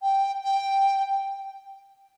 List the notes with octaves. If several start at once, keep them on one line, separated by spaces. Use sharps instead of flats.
G5
G5